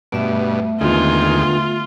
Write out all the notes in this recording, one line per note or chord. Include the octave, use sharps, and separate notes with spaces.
G2 B2 A3 E5
D#2 D3 G#3 B3 F4